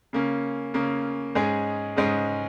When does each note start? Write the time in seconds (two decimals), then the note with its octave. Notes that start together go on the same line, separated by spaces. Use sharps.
0.13 C#3 A#3 C#4
0.74 C#3 A#3 C#4
1.35 G#2 G#3 C#4 G#4
1.97 G#2 G#3 C#4 G#4